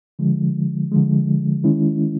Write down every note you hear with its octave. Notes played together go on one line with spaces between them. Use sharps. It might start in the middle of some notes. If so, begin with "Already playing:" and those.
D3 F3 G#3
D3 F3 G#3
D#3 G#3 C#4 E4